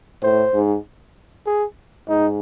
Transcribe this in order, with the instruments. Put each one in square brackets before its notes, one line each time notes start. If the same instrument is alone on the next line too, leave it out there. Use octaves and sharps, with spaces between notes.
[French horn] A2 [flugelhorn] C5
[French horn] G#2
[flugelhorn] G#4
[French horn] G#2 [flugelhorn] D#4